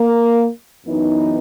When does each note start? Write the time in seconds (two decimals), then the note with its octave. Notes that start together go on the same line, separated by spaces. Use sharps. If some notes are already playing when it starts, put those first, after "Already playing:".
Already playing: A#3 A#4
0.85 F#2 E3 B3 D#4